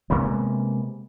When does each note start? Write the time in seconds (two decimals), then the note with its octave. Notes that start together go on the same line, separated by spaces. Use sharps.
0.10 C3 G#3 A#3 B3